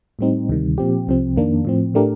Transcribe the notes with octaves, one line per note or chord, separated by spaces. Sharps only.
A2 G3 C4 D#4
D2 C3 D#3 G3
A#2 F3 C4 G4
C2 C3 F3 C4
F2 D#3 A#3 D4
A2 F3 C4
A2 A3 D4 G4 A#4